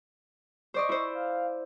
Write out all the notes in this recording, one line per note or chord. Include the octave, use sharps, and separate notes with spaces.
C5 D5 D#5 C#6
E4 C5
F5